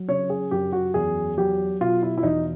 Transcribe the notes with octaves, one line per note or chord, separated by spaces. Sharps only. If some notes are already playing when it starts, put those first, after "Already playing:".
Already playing: F#3
C#3 C#5
G#4
F#2 G4
F#4
E2 G#4
F#3 G4
B2 F4
E4
E4
E2 D#4